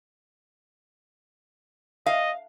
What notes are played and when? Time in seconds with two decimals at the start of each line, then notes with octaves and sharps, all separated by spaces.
2.06 D#5 F5